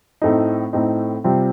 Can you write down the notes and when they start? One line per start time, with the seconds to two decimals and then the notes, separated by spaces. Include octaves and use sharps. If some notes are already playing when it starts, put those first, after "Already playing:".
0.22 A2 A3 C4 D#4
0.73 A2 A3 C4 D#4
1.24 C3 G3 C4 F4